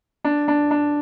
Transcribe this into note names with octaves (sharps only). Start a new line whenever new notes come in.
D4
D4
D4